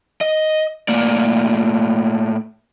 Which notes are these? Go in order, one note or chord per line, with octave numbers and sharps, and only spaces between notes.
D#5
A2 A#3 D5